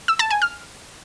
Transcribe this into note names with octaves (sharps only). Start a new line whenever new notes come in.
E6
A5
G#5
F6